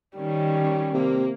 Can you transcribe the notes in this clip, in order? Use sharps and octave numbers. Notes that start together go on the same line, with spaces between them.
D#3 G3 C#4
C3 A#3